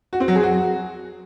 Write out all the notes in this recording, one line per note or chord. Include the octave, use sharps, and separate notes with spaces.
F#4
C4
F#3
G#4
F#4